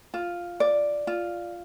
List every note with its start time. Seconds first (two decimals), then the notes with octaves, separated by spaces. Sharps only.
0.14 F4
0.60 D5
1.07 F4